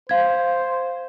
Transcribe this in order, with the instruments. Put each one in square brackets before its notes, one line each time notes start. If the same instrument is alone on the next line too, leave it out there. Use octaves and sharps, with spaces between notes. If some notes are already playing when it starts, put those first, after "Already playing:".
[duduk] C5 [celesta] F5 G#6